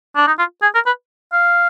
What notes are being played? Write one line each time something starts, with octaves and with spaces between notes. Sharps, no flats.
D4
D#4
F4
G#4
A#4
B4
F5